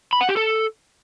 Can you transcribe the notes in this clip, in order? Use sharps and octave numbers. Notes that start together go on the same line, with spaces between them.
B5
F#5
G4
A4